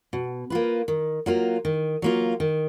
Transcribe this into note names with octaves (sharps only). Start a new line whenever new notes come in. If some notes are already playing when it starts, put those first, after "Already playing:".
B2
A#3 F4 B4
D#3
F#3 A#3 F4
D#3
F#3 A#3 F4
D#3